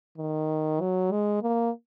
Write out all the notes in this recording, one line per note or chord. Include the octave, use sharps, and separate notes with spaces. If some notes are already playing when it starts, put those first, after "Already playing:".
D#3
F#3
G#3
A#3